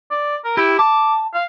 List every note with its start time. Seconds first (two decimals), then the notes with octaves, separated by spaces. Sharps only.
0.11 D5
0.45 A#4
0.57 E4 G4
0.79 A5 D6
1.34 F5